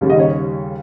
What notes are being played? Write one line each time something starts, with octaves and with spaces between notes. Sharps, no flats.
D#2 C#3 G3
D#5
C#5